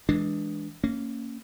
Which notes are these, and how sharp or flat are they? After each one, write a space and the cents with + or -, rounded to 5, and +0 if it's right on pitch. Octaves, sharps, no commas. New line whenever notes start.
E3 -15 G#3 +0 D4 +0
A#3 -20 C#4 +0